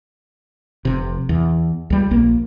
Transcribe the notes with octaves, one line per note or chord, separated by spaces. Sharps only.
F1 C3
E2
C#2 G3
A#1 A#3